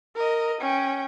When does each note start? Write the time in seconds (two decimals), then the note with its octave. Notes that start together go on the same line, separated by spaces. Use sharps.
0.16 A#4 D#5
0.61 C#4 G5